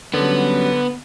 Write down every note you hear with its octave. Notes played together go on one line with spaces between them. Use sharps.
D3 F#3 G3 B3 C#4